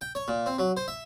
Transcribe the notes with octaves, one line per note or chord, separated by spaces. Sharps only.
G5
C#5
A#2
C4
F#3
C5
E5